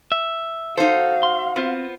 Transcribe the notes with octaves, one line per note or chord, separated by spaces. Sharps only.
E5
D#4 F#4 A4 C5 F5
C6
B3 C4 F4 C5